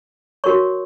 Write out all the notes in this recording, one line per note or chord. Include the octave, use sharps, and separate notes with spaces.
F#4 A#4 C#5 C#6